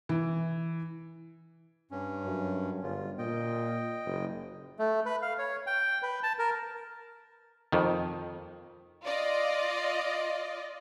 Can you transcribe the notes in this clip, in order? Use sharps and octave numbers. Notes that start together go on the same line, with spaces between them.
E3
G2 C#4
F#2
G1 F4
A#2 D#5 G5
F#1
A3
B4
F5
C#5
G5
B4
A5
A#4
F2 D#3
F4 D5 D#5